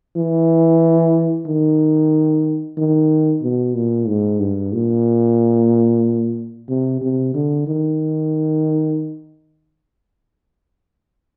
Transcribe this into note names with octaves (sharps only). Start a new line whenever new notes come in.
E3
D#3
D#3
B2
A#2
G#2
G2
A#2
C3
C3
D3
D#3